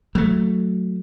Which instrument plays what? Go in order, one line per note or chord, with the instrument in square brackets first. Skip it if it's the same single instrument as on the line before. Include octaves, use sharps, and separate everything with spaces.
[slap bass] F#3 A3